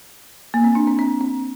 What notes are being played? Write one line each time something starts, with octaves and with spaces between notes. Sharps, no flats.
A#3
C4
D4
C4
C4
C4